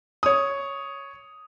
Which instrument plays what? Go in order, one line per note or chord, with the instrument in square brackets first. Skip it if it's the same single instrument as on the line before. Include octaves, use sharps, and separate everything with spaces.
[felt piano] C#5 D#6